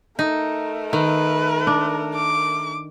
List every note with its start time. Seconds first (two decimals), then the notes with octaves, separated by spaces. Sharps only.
0.19 A3 D#4 A#4
0.93 D#3 D#4 B4
1.67 D4
2.15 D6